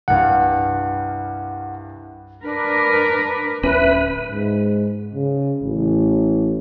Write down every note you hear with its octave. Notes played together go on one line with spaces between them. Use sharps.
C2 G2 F5 F#5
D4 A#4 B4
D1 C#4 B4 E5
G#2
C#3
A1